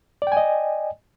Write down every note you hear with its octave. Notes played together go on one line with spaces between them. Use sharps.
D5 D#5 G5 G#5